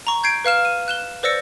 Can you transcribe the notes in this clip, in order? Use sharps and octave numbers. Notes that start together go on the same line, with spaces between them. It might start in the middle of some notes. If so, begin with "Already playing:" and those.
A#5 C#6
G6 G#6 C7 D7
B4 F5 F6 E7
D#7
F#6 E7 G7
B4 C5 D5 E6 A#6 C#7